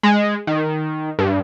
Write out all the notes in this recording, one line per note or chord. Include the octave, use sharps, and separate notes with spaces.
G#3
D#3
G2